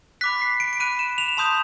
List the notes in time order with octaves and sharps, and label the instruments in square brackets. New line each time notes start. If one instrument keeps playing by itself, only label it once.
[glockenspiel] B5 D6 F#6 B6
C7
D7
D7
B5 D6 F#6 D#7
E7
F7
A5 C6 D#6 G6 F7